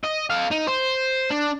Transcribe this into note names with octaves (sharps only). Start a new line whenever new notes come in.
D#5
A4 F5
D#4
C5
D4